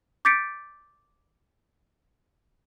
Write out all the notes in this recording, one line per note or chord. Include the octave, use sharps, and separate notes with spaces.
D6 G6 A6 B6 C#7 D7